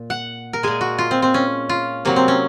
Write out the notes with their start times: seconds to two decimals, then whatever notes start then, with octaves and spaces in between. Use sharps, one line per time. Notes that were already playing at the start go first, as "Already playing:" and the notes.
Already playing: A#2
0.10 F#5
0.53 A#4
0.63 A#2 G#3 G#4
0.81 F#4
0.98 F4
1.11 C4
1.22 C4
1.34 C#4
1.69 F4
2.05 C3 F#3 A#3
2.16 C4
2.28 C#4